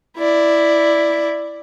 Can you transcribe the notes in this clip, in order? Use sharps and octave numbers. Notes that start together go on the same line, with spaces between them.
E4 D5